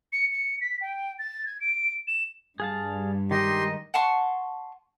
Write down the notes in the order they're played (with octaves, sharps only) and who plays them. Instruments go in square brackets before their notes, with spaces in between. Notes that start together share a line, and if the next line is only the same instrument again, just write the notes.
[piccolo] C#7
C#7
B6
G5
A6
G#6
D7
E7
[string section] G2 [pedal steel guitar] G#4 F5 A5
[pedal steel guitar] D#3 G#3 D#4 [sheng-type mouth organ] G4 C6 [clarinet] D#5
[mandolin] F#5 A5 C6 C#6